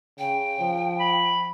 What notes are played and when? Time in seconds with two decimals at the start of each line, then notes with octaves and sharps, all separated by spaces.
0.19 C#3 G5
0.60 F3
1.00 B5